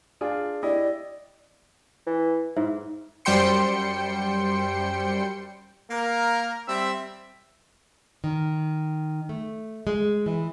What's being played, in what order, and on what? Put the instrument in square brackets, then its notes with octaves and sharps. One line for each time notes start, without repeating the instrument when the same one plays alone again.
[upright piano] D4 F4 G#4
[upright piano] E4 G4 D#5 [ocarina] D5
[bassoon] E3
[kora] G#2 [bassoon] E4
[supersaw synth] F#2 G3 C5 G5 C6 C#7
[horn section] A#3 A#4
G3 C4 E5
[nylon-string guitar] D#3
A3
G#3
E3